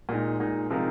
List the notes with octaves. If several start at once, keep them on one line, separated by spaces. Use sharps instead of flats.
A#2 G#3 D#4
A#2 G#3 D#4
C3 F3 G#3 D#4 A#4